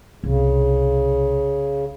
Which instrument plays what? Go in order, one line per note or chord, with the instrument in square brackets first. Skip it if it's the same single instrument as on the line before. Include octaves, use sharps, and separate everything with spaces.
[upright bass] C2 [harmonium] C#3